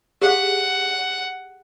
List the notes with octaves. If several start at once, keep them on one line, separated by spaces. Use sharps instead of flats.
G4 G#4 F5 F#5